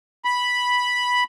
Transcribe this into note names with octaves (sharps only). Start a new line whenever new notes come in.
B5